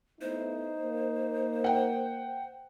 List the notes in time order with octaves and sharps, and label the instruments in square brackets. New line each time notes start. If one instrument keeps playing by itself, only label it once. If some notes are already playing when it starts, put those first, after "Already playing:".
[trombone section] A3 B3 E4 [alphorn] D#4 [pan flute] C5
[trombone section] A#3
[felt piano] F#5 G5